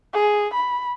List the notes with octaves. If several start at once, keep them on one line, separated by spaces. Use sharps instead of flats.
G#4
B5